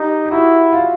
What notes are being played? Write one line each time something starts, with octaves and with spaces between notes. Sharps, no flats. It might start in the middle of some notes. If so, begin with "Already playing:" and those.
Already playing: D#4 G4
G4
E4 F#4
F4